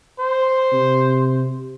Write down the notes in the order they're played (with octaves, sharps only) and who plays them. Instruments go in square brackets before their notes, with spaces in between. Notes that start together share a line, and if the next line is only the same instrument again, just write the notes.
[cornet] C5
[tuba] C3